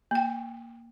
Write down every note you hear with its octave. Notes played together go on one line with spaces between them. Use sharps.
A#3 G5